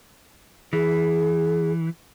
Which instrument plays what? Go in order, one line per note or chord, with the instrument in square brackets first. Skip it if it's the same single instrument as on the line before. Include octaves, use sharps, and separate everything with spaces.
[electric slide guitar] E3 [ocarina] G#4